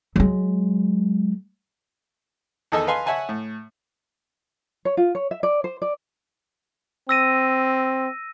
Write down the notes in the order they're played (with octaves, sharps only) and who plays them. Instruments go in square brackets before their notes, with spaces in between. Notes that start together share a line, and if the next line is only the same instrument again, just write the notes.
[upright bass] F#3 G#3
[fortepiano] E2 D#3 A4 D#5 G#5 E6
B4 D#5 F5 G#5 A5 C6
C#5 E5 F#5 G#5 A5
A2
[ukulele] C#5
F4
C#5
E5
D5
C5
D5
[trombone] C4 [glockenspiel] E6 A#6 D#7